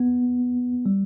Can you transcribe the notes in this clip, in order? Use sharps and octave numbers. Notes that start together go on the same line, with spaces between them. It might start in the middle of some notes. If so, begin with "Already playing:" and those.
Already playing: B3
G3